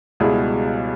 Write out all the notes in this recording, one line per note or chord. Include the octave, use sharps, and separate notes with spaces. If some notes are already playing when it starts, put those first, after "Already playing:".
C#2 B2 G3 E4 G#4